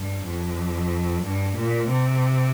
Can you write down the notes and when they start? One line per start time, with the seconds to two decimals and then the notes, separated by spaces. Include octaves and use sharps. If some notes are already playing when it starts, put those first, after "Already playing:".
Already playing: G2
0.26 F2
1.24 G2
1.57 A#2
1.89 C3